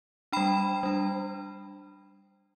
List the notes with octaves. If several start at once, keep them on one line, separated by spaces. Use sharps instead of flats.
G3 D4 G5 B5
G3 D4